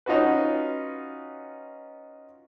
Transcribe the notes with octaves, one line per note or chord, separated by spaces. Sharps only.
C#4 D#4 F4 F#4 B4